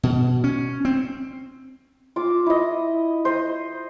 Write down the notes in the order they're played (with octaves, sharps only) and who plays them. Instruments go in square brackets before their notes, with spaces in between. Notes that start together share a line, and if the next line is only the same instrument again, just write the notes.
[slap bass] B2
C#4
C4
[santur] F4 D6
E4 D#5
C5 D#5